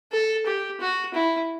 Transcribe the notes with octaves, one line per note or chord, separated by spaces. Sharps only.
A4
G4
F#4
E4